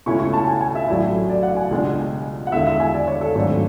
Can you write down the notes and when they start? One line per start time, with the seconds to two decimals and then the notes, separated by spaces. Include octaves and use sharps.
0.06 C#2 B2 A3 C#4 E4 C#6
0.20 C#6
0.34 A5
0.47 G#5
0.61 G#5
0.75 E5
0.88 A1 A2 F#3 A3 E4 D5
1.29 D5
1.43 F#5
1.57 G#5
1.71 C#2 B2 G#3 D4
2.47 F#5
2.52 E2 D3 G#3 E5
2.67 E5
2.80 G#5
2.94 D5
3.08 C#5
3.21 A4
3.35 G#1 G#2 F#3 A3 D4